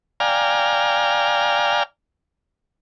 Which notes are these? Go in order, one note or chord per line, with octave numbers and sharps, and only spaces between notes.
D5 F5 G5 G#5 A#5 F6